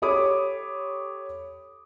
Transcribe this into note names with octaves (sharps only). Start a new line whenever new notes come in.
G4 A4 C#5 B5 D6 D#6